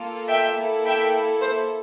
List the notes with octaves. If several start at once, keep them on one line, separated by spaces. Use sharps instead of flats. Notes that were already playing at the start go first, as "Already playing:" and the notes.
Already playing: A#3 F4 A4
E5 G5
A#3 E4 A4
E5 G5
C5